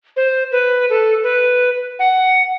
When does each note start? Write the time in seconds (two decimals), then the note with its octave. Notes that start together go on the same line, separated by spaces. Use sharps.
0.16 C5
0.52 B4
0.90 A4
1.23 B4
1.99 F#5